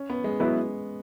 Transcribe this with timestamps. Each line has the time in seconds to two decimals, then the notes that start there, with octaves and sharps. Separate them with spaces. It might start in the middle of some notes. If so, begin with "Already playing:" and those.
Already playing: C#4
0.10 B3
0.24 G#3
0.40 F#3 G#3 B3 E4 B4